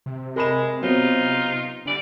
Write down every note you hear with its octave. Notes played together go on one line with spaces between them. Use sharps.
C3
G#3 A#4 B5 E7
F#3 B3 C4 D#4 F4
D3 E3 G3 D5